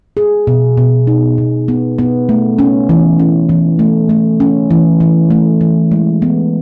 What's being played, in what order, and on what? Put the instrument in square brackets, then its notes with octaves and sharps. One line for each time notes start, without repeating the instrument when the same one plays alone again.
[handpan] G#4
B2
B2
D#4
B2
B3
B3
A3
C#4
E3
C#4
E3
A3
A3
C#4
E3
E3
A3
E3
G#3
B3